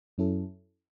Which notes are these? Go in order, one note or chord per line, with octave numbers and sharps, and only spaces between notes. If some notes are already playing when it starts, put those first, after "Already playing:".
F#2 F#3 C#4 E4 A4